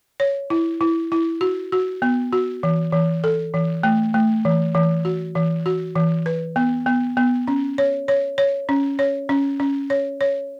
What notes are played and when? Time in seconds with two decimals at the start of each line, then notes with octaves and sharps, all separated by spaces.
0.20 C#5
0.50 E4
0.81 E4
1.12 E4
1.41 F#4
1.72 F#4
2.02 B3
2.33 F#4
2.63 E3
2.92 E3
3.24 A4
3.54 E3
3.83 A3
4.14 A3
4.45 E3
4.75 E3
5.05 F#4
5.35 E3
5.66 F#4
5.96 E3
6.26 B4
6.56 B3
6.86 B3
7.17 B3
7.48 C#4
7.78 C#5
8.08 C#5
8.38 C#5
8.69 C#4
8.99 C#5
9.29 C#4
9.60 C#4
9.90 C#5
10.21 C#5